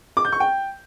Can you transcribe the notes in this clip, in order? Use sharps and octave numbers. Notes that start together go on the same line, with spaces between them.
D6
G6
C#6
G5